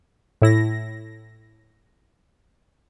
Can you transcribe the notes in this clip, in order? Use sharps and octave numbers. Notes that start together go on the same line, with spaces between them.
A2 E4 A#6